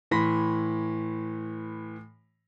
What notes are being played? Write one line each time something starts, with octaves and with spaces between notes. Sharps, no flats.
A2 E3 B5 C6 A#6 B6